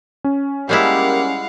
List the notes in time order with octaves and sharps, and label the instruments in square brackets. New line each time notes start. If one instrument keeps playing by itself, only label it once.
[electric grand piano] C#4
[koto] G3 G#3 E4 [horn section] A#3 G4 [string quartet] F5 F#5